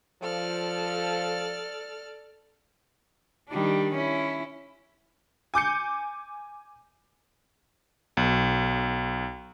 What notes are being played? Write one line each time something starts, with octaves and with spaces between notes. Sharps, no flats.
F3 A4 D5 F6
D#3 G3 D4
C#4 E4
G#5 D6 G6 C#7
B1